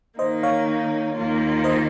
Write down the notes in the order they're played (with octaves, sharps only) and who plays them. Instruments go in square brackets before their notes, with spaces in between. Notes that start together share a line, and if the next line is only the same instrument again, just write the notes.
[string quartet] D#3 A#3 D#4 [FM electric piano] C5 D#5
[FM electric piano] C#5 F5
[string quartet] D#2 D#3 A#3 F4
[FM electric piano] C5 D#5